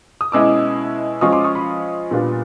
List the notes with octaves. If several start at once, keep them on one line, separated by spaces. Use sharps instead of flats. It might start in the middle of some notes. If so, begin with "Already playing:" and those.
D#6
B2 G#3 C#4 E4 D6 E6
F3 G#3 C#4 F4 C#6 D#6
C6 D6
C#6 D#6
B5 C#6
A#2 G3 B3 D4 F4